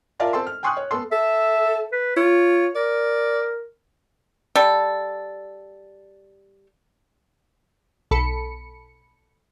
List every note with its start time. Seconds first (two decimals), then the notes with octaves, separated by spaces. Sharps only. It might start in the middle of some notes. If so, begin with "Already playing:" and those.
0.20 F4 A#4 D5 E5 F5 A5
0.33 C4 A4 A5 C6
0.47 F6
0.63 G5 G#5 C6 C#6 D#6 F#6
0.77 C#5
0.91 B3 A4 C6
1.12 A4 E5
1.92 B4
2.17 F4 C#5
2.75 A#4 D5
4.56 G3 A4
8.11 B1 A4 B5 C#7